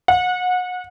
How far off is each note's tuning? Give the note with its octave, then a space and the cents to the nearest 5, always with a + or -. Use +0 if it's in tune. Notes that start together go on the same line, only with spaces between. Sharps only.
F#5 -30